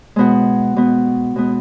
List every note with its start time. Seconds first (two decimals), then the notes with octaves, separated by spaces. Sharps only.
0.16 B2 G#3 B3 F#5
0.76 B2 G#3 B3
1.36 B2 G#3 B3